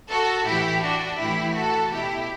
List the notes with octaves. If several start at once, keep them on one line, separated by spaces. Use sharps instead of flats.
F#4 A4
A2 E3 E4 G4
D4 F#4
A2 E3 E4 G4
F#4 A4
B2 E4 G4